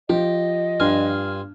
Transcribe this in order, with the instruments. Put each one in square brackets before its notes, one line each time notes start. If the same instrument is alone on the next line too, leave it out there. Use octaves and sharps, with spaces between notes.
[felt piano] F3 [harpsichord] G4 [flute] D#5
[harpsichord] G2 F4 G#5 [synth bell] D4 F6